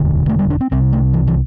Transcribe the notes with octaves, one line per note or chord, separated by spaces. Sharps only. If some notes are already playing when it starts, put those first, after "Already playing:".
Already playing: E1 D2 D3
A3
G3
D4
C4
C2 C3 C4
A3
E3
E3